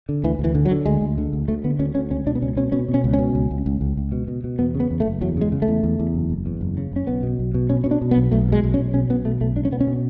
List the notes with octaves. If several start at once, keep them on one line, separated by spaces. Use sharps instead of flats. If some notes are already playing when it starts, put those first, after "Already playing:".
D3
D2 E3
D2
E3
D3
F#3
D3
D2 G#3
D2
D3
D2
D2 A3
D3 B3
D2 C#4
D2 C#4
C#2 C#4
B2 D4
B3
C#2 C#4
B2 C#4
B2 C#4
B2
C#4
C#2
C#4
B2
C#2
C#2
C#2
C#2
C#2
B2
B2
B2
E2 B3
C#3
B3
E2
A3
F#1
E2 F#3
C#3 G#3
C#3
A3
E2
E2
E2
F#1
F#1
E2
F#1
C#3
F#1 C#4
B1 B3
B2
B1
B2
B2 C#4
B2 C#4
D4
B2
B3
B1
B1 A3
B2 G#3
B1
C#4
B1
B2 C#4
B1 B3
B2 A3
B1 A3
C#2 D4
C#4
B2 B3
C#4
B2